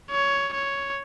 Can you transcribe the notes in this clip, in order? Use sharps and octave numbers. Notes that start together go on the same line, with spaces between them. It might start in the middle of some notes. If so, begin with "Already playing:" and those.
C#5
C#5